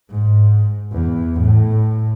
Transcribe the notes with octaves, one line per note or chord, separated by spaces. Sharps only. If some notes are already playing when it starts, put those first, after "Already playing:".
G#2
E2
A2